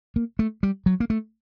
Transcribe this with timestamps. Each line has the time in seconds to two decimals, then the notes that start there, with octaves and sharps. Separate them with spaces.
0.16 A#3
0.39 A3
0.63 G3
0.86 F#3
1.00 A#3
1.10 A3